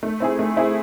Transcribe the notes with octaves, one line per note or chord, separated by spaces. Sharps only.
A3
C4 E4 G#4
A3
C4 E4 G#4